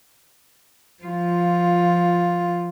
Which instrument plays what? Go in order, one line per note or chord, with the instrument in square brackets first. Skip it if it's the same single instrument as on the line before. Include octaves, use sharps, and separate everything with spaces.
[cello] F3 F4